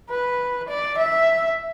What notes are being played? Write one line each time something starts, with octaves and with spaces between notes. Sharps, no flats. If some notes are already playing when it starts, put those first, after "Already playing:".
B4
D5
E5